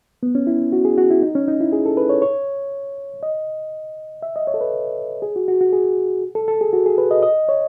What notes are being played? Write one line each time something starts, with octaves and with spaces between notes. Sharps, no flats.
B3
C#4
E4
F#4
G#4
F#4
E4
D#4
C#4
D#4
E4
G#4
A4
B4
C#5
C#5
D#5
E5
D#5
C#5
A4
B4
G#4
F#4
F#4
F#4
G#4
A4
A4
G#4
F#4
G#4
B4
D#5
D#5
C#5